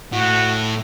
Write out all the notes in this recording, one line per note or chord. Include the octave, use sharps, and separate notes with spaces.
A2 F#4